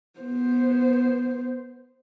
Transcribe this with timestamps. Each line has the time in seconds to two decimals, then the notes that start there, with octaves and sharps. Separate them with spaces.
0.20 B3 C5